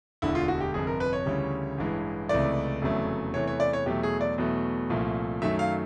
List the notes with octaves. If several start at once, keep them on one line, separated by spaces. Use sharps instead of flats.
E1 D2 D3 E4
F4
F#4
G4
G1 F2 C3 G#4
A#4
B4
C#5
D2 C#3 E3 G3
A1 G2 E3 G#3
C#2 C3 E3 A3 D5
F1 E2 C#3 F#3 A3
E2 C3 E3 A3 C#5
C#5
D5
C#5
E2 B2 F#3 A3 G4
G#4
D5
E2 B2 F#3 A3
C2 A#2 F3 A3
F#2 D#3 F#3 A3 E5
F5